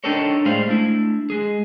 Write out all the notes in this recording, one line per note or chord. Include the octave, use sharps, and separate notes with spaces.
D4 D#4 G4 A4 A#4 C#5
A2 G3 G#3 G#4 C5 F5
A3 D4 E4
G#3 G#4